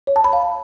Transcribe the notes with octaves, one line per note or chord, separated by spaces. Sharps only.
C#5
A5
B5
F5